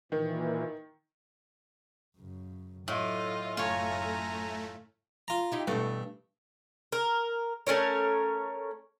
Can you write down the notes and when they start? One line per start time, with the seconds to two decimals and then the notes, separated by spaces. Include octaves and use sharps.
0.12 A#2 D#3 E3
2.18 F#2 C#3
2.88 A2 F#3 F4 D#5
3.57 F#1 A3 F4 C#5 G#5 A#5
5.28 F4 A#5
5.52 D#4 E4 G4
5.67 G2 B2 E3 A3
6.92 A#4
7.67 A3 C#4 A#4 C#5